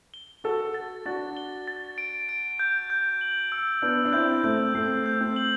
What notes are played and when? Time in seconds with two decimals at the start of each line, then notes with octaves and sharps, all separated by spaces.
0.14 G7
0.44 F#4 A4 A6
0.74 A6
1.06 D4 F#4 A6
1.37 G7
1.68 A6
1.98 D7
2.29 D7
2.59 G6
2.90 G6
3.21 F#7
3.52 E6
3.82 B3 D4 G6
4.05 D4
4.13 C4 E4 G6
4.44 A3 C4 G6
4.75 A3 C4 C7
5.06 G6
5.21 A3 C4
5.36 F#7